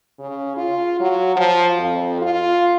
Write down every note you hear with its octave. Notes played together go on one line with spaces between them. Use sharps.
C#3
F4
F#3
F3
F2
F4